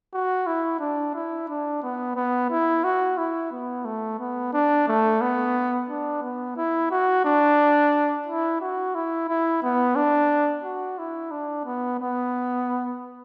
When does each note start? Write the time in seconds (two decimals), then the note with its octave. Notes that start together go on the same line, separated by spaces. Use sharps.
0.13 F#4
0.47 E4
0.80 D4
1.14 E4
1.48 D4
1.82 B3
2.16 B3
2.51 E4
2.84 F#4
3.18 E4
3.52 B3
3.85 A3
4.20 B3
4.53 D4
4.88 A3
5.21 B3
5.89 D4
6.22 B3
6.57 E4
6.91 F#4
7.25 D4
8.27 E4
8.61 F#4
8.95 E4
9.28 E4
9.63 B3
9.96 D4
10.64 F#4
10.98 E4
11.31 D4
11.66 B3
12.00 B3